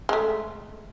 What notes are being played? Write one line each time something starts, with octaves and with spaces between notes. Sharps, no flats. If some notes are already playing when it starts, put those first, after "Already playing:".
G#3 A3